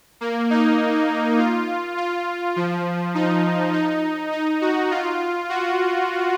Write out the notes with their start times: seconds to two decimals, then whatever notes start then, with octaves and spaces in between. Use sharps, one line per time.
0.21 A#3
0.50 D#4
1.39 F4
1.97 F4
2.56 F3
3.15 D#4
3.73 D#4
4.32 D#4
4.61 F#4
4.91 F4
5.49 F#4